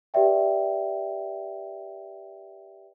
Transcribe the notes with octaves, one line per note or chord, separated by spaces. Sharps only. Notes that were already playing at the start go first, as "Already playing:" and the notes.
G4 B4 D5 E5 G5